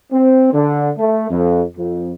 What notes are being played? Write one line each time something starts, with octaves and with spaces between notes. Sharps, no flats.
C4
D3
A3
F2
F2